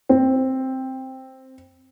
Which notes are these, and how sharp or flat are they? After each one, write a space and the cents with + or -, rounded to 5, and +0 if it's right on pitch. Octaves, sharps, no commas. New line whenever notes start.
C4 +5